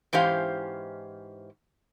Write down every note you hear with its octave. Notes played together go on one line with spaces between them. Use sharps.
G#2 E3 C#4 G4 C5 F5